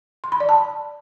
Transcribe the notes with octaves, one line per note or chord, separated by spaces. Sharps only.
C6
B5
D5
A5